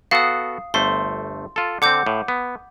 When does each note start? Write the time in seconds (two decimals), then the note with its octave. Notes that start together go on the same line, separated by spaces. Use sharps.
0.11 B3 F#4 A4 F5 D#6
0.74 G1 A3 C5 C6
1.56 F4 A4
1.82 D3 C4 F#5 D6 G6
2.06 A2
2.28 B3